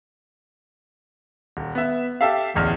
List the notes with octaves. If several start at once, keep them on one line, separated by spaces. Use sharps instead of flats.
D#1
B3 E5
G4 A4 E5 F5
D1 A1 E2 F6